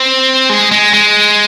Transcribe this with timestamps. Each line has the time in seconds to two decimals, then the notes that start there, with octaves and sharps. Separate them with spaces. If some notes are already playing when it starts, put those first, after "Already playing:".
Already playing: C4
0.50 G#3
0.72 G#3
0.94 G#3